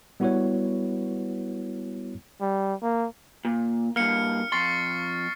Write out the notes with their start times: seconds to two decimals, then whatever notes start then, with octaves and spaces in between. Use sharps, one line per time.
0.20 G3 B3 E4 F#4 B4 C#5
2.41 G3
2.83 A#3
3.45 A#2
3.96 G2 A#3 F6 C#7
4.52 F2 C6 C#6 A6 C7